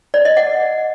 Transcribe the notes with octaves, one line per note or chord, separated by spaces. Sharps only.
D5
D#5
F#5